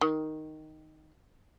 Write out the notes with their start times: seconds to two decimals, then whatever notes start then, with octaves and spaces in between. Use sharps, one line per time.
0.01 D#3